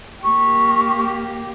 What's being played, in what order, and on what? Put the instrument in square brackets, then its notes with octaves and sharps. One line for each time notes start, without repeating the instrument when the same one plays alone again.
[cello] A#3 G4 [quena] C#6